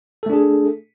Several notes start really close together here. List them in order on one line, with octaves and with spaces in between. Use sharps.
A4 A3 D4 G#4